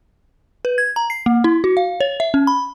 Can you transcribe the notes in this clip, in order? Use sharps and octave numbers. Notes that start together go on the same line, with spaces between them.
B4
G#6
A#5
C7
A#3
E4
F#4
F5
C#5
E5
C#4
B5